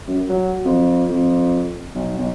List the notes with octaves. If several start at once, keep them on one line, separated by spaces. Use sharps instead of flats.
F#2
F#3
F2
F2
B1
B1